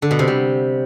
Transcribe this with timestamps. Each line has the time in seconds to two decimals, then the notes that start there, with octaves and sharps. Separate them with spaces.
0.02 D3
0.11 B2
0.19 C3
0.27 G3